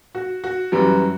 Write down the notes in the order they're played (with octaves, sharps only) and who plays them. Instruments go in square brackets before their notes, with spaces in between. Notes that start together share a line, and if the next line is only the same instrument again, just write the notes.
[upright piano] F#4
F#4
F#2 E3 G3